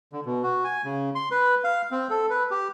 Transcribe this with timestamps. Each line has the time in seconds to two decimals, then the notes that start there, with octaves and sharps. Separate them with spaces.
0.13 D3
0.25 B2
0.43 F#4
0.64 G#5
0.84 C#3
1.15 C6
1.31 B4
1.64 F5
1.91 C4
2.10 A4
2.30 B4
2.51 G4